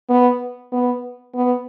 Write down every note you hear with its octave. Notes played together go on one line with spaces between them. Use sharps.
B3
B3
B3